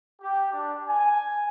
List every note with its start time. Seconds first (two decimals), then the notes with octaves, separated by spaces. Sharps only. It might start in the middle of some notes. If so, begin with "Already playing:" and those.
0.22 G4
0.53 D4
0.89 G#5